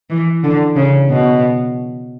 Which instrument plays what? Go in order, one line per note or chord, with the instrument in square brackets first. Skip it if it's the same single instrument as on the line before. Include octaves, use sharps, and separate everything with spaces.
[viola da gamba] E3
D3
C#3
B2